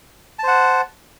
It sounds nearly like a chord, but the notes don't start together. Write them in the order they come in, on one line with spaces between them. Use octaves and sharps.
A5 C5 F#5